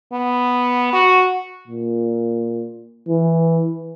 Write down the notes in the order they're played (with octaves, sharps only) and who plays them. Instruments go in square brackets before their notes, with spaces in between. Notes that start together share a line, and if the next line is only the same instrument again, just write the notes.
[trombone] B3
F#4
[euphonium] A#2
E3